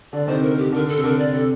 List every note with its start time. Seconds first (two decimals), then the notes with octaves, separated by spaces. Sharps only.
0.12 D3 D5
0.27 C3 D#3 C5
0.43 A#4
0.58 G4
0.72 D3 A#4
0.88 A4
0.97 C3
1.03 D3 A#4
1.19 D5
1.33 C3 A4